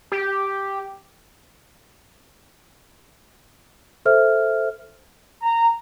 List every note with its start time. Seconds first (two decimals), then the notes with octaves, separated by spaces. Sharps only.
0.12 G4
4.06 A4 C5 E5 F6
5.42 A#5